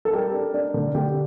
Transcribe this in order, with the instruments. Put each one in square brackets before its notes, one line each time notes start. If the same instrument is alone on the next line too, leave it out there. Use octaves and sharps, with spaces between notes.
[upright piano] A4
G3 G4 A#4
D4
D4
D3
D3 G4